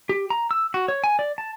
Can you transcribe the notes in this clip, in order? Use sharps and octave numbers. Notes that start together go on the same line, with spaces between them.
G4
A#5
E6
F#4
C#5
G#5
D5
A5